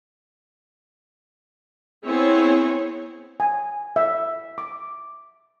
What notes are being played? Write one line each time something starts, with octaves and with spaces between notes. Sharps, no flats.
B3 C4 E4 G#4 C#5
G#5
E5
D6